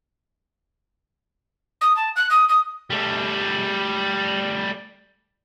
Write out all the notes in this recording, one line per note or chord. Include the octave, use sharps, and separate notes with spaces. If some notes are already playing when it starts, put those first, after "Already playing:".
D#6
A5
F#6
D#6
D#6
G3 A3